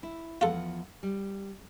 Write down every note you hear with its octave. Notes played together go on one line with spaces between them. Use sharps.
E4
E2 F3 F4 A4 F#5
G3